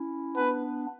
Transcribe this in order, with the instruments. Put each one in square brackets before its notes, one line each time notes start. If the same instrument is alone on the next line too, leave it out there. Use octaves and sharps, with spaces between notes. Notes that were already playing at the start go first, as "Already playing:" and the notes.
Already playing: [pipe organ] C#4 E4
[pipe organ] B3 D4 [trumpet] B4